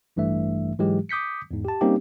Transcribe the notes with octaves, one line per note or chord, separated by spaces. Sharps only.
A1 G2 E3 A3 E5
G#2 E3 F#3 G#3 G4
D6 D#6 G6 B6 C#7
E2 G#2
G4 A5
G3 A#3 C4 C#4 D#4 G4